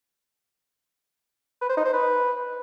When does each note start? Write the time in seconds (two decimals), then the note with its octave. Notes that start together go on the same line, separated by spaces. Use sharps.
1.61 B4
1.69 C5
1.77 D#4
1.85 C5
1.93 B4